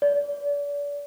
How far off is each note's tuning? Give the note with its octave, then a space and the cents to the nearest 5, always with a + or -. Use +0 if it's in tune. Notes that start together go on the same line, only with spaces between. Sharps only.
D5 -35